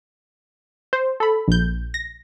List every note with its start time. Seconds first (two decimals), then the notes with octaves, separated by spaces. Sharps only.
0.93 C5
1.20 A4 B5
1.48 A#1 G6
1.94 A#6